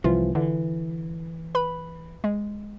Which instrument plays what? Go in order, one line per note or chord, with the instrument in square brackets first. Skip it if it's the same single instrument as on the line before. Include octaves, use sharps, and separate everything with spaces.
[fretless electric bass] C2 E3 F3 [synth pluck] F4
[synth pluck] D3 [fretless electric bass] E3
[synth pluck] B4 B5
G#3